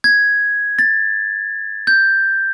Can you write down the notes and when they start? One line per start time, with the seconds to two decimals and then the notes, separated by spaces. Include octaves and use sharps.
0.04 G#6
0.79 A6
1.87 G6